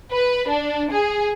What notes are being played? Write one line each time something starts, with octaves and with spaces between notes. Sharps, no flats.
B4
D4
G#4